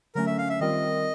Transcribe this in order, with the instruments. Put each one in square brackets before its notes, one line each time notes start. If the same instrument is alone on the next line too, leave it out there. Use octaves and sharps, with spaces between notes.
[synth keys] D3 F#3 A3 C#4 [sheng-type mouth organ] A#4
[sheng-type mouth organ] E5
F5
E5
[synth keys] D#3 G3 C4 F4 A#4 [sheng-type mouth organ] D#5